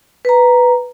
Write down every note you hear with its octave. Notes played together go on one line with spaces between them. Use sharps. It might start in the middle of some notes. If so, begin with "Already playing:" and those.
B4 A#5